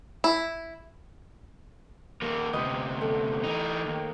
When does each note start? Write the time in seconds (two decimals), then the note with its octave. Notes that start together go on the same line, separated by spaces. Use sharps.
0.24 E4
2.22 G3 A#3
2.53 D2 C3 G4 B4 D#5
3.01 A3
3.44 E3 D#4
3.86 D#2